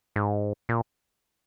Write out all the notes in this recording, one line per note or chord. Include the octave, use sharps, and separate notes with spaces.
G#2
A#2